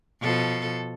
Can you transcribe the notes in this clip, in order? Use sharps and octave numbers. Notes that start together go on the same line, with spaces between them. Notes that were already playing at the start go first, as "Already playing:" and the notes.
B2 F3 A4